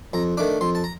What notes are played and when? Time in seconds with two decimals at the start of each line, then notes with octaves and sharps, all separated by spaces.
0.13 F2 A#5
0.37 D#3 A3 D4 D6
0.61 F2 C6
0.75 A5
0.84 A#5